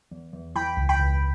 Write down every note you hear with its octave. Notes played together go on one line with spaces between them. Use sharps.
E2
E2
E3 G5 B5
C#2
G5 B5
C#2